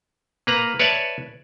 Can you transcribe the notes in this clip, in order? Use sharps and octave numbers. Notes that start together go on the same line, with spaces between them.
A#3 B4 A#5
B4 C#5 D5 E5 A5